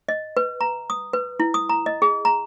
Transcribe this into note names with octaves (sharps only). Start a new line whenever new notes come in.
D#5
B4
A#5
D#6
B4
E4
D#6
A#5
D#5
G#4
A#5